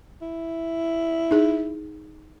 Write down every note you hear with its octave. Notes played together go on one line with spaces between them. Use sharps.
E4
D#4 G#4